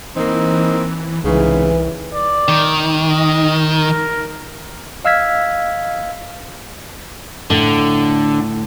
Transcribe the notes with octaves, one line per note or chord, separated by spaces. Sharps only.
E3 A#3 C4 D#4
C2 G#2 C#3 E3
D5
D#3
D#5
A#4
D#5 F5 E6 F6 G#6 B6
A2 D3